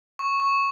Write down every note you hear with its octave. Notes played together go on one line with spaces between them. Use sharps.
C#6
C#6